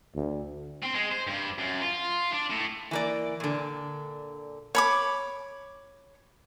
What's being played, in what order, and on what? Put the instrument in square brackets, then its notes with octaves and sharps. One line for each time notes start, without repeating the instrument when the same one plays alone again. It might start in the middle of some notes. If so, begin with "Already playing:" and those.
[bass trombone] D2
[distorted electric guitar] C4
G#3
C5
G2
F#2
F4
D4
A2
[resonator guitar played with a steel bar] E3 A#3 D5
A#2 D3
[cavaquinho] C#5 B5 D6